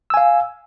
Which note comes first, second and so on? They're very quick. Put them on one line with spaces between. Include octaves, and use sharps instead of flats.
E6 G#5 F5